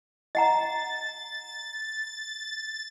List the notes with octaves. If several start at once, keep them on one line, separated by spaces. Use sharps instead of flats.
D#5 F#5 A#5 A6